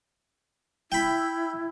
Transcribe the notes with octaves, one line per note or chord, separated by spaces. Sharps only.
E4 G5 B5